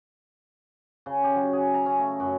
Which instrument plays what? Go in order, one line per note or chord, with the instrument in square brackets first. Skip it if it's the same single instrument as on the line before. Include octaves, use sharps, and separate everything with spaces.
[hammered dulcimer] C#3
G4
F#3
G#4
A#5
C#4
A3
F#2